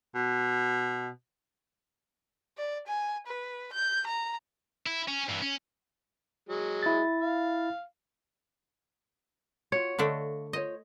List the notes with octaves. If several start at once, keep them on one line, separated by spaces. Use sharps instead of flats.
B2
D5
G#5
B4
G6
A#5
E4
C#4
G2 E3
C#4
F#3 G#3
E4 A6
F5
F4 F#4 C#5
D3 A3 D4 A4 D#5 F5
F4 C5 C#5 D#5